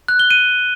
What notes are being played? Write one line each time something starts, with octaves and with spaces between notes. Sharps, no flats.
F#6
G7
D#7